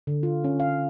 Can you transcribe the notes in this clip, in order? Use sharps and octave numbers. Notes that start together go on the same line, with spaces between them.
D3
F4
C#4
F5